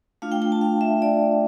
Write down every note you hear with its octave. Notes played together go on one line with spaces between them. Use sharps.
A3 D4 F4 F5
G5
G5
A5
F5
E5
D5